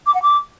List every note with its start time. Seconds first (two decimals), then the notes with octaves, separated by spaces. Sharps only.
0.06 D6
0.14 F#5
0.22 D6